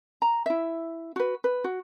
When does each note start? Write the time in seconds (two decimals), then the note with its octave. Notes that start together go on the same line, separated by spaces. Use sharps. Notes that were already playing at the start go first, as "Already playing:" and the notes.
0.22 A#5
0.46 E4 E5
1.16 F#4 B4
1.44 B4
1.64 F#4